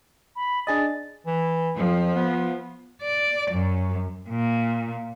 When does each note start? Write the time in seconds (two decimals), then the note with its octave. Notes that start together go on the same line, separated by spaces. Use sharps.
0.36 B5
0.67 D4 G#4 D#5 A6
1.27 E3
1.76 F2 F3
2.16 B3
3.02 D5
3.52 F#2
4.29 A#2